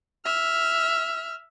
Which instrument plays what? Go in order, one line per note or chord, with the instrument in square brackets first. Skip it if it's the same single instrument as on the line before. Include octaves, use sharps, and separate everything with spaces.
[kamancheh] E5 F6